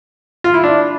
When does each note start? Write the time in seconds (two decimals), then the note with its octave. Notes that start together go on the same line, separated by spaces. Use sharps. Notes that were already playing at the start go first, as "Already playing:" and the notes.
0.44 F4
0.54 E4
0.64 D4